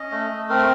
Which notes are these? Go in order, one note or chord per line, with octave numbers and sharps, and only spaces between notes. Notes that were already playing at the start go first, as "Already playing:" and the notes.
Already playing: C#4 D#5
A3
A3
C4 A#4